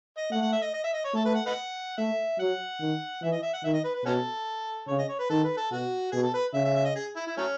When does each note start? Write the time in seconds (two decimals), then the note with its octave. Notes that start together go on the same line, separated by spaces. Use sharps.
0.17 D#5
0.31 A3 F#5
0.41 F#5
0.52 E5
0.62 D#5
0.73 D#5
0.84 E5
0.93 D#5
1.04 C#5
1.14 A3 A4
1.25 B4
1.35 F#5
1.46 B4 D#5 F#5
1.98 A3 E5
2.38 F#3 F#5
2.80 D#3
3.22 E3 E5
3.32 D#5
3.42 E5
3.53 F#5
3.64 D#3 E5
3.74 D#5
3.84 B4
3.95 B4
4.04 B2 C#4 F#4 A4
4.88 C#3 C#5
4.99 D#5
5.09 C#5
5.19 B4
5.30 D#3 A4
5.44 B4
5.57 A4
5.71 B2 F#4
6.12 B2 G#4
6.23 A4
6.34 B4
6.54 C#3 E5
6.65 E5
6.75 E5
6.85 D#5
6.96 G#4
7.16 E4
7.27 E4
7.37 F#3 A3 C#4